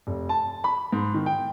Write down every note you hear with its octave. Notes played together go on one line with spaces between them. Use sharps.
F1
A5
B5
G#2
D#3
G5